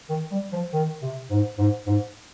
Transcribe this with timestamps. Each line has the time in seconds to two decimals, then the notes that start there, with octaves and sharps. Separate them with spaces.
0.10 D#3
0.31 G3
0.52 F3
0.73 D#3
1.02 C3
1.30 G#2
1.58 G#2
1.87 G#2